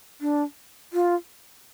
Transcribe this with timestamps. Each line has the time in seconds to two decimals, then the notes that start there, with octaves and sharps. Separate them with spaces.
0.21 D4
0.93 F4